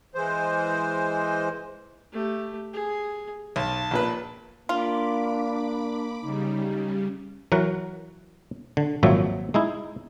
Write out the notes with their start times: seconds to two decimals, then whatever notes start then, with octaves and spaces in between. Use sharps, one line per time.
0.15 E3 G#3 C5
2.12 A3 G4
2.73 G#4
3.56 B1 A5
3.91 A#1 A#2 B4
4.69 A#3 D4 F4 B5 D6
6.21 C#3 G3 D#4
7.52 E3 F#3 A#4 F#5
8.77 D3
9.03 G#1 A#2 F3 F#3 E5
9.54 G#3 D#4 E4